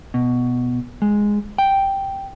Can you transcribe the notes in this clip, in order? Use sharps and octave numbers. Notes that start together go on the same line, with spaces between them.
B2
G#3
G5